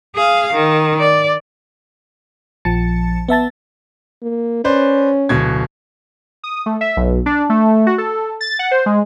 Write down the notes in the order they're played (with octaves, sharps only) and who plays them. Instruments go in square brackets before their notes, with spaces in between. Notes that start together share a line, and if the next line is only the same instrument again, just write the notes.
[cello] G#4 F5
D#3
D5
[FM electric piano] A#1 F3 A5 A6 C#7
B3 E5 A5 A6
[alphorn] A#3
[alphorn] C#4 [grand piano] B4 C5 D5
[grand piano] D1 B2 G#6
[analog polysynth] D#6
A3
E5
B1
D4
A3
F#4
A4
A6
F#5
C5
G#3